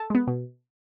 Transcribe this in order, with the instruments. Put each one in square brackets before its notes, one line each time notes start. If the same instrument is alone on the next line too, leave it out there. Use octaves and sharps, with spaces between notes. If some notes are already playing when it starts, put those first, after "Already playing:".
Already playing: [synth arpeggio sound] A4 A5
G#3 B3
B2